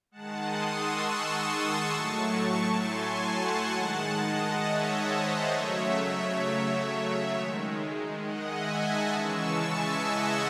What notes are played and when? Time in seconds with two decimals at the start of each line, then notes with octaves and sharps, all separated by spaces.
0.11 D#3 G#3 F#5 A5
0.41 C6 D#6
0.72 C#6 E6
1.02 C#6 E6
1.31 C6 D#6
1.61 A5 C#6
1.92 A2 F#3 A3
2.81 G#5 C6
3.27 F#5 A5
3.71 D#3 G#3 F#5 A5
4.16 D#5 F#5
4.62 C#5 E5
5.06 C5 D#5
5.51 C#3 F#3 A3 C#5 E5
7.32 D#3 G#3
8.21 D#5 F#5
8.51 E5 G#5
8.81 F#5 A5
9.12 C#3 E3 G#3 C#6 E6
9.41 A5 C#6
9.71 E5 G#5
10.01 D#5 F#5